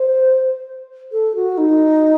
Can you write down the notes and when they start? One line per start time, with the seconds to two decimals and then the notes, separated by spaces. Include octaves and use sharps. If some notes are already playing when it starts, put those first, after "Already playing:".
Already playing: C5
1.11 A4
1.35 F#4
1.57 D#4